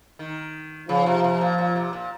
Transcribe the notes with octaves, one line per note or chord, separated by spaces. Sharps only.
D#3
C#3 F3
C3
C3
A#2
A#2
C3
A#2